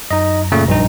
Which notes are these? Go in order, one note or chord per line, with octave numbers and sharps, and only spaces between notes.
F#2 D#4 D#5 A#5
A#2 C#3 A3
A#1 G2 D#4